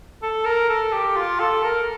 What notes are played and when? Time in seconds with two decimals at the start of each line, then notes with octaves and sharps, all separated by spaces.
0.22 A4
0.45 A#4
0.69 A4
0.93 G4
1.16 F4
1.40 A4
1.64 A#4